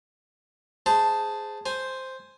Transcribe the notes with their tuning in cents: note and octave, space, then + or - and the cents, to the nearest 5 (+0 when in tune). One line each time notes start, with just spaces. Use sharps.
G#4 +0 C5 -15 A5 +0
C5 +0 G#5 +0